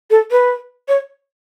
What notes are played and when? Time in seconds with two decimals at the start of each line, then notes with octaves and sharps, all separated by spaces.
0.10 A4
0.31 B4
0.88 C#5